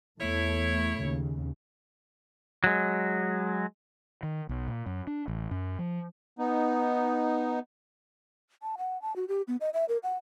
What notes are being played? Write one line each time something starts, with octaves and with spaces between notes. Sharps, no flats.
E2 A3 E4 C#5
D#2 C#3
F#3 G#3
D#3
B1
A#2
F#2
D4
A1
F#2
F3
B3 D#4
A5
F#5
A5
F#4
G4
B3
D#5
E5
A#4
F#5